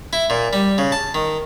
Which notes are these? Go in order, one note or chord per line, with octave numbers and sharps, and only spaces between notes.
E4
A#2
G3
C#3
A5
D#3